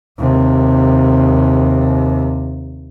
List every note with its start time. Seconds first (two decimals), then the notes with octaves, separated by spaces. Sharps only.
0.19 D#2 C3